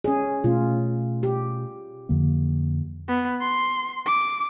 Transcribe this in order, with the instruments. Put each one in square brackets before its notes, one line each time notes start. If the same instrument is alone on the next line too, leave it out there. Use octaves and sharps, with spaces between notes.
[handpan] C#4 G#4
[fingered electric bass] B2 A3 C#4 [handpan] F4
[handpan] G4
[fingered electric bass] F2 D3 A#3
[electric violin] B3
C6
D6